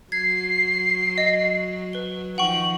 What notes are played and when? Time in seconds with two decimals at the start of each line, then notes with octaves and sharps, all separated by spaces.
0.12 F#3 G#6 C7
1.18 D#5
1.93 B4 G7
2.38 D#3 F3 D#4 F#5 G5 C#6 F#7